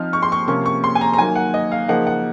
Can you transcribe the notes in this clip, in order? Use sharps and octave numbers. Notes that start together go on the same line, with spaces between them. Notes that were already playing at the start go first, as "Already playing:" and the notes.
Already playing: F3 C4 D#4 F6
C#6
C6
C#6
C3 F3 A#3 C#4 C#6
C#6
C6
G#5
A#5
A#5
D#3 F#3 A#3 G#5
F#5
D#5
F5
C#3 F3 A#3 D#4 F#5
F#5